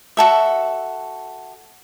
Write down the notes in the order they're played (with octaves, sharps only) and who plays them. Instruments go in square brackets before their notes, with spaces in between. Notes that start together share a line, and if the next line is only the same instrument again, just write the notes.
[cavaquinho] F#4 A4 E5